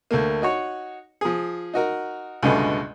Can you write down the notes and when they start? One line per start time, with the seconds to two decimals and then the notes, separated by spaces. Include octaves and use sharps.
0.11 D2 A3 A#3
0.42 D#4 F#4 C#5
1.21 F3 G#4
1.74 D#4 F#4 A#4
2.43 C#2 G2 B2 D3 G#3 A3